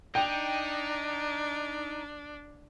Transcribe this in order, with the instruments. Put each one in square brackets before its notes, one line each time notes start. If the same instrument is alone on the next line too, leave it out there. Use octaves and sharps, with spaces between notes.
[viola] D4 [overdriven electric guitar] D#4 [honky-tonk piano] G5